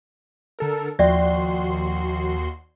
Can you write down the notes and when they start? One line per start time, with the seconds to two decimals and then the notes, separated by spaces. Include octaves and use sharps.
0.59 D3 A4 A#4
0.99 D#2 F3 F#4 D5 E5 G5 C6